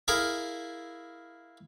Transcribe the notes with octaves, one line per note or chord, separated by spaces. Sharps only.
E4 G#4 A#4 F5